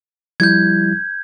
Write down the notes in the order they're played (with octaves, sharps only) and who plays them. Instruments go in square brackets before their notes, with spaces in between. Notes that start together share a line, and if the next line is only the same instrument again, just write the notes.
[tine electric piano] F3 G3 E4 [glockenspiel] G6 G#6